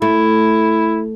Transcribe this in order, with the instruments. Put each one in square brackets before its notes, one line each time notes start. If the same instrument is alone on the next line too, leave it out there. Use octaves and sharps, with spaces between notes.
[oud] A3 [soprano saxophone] E4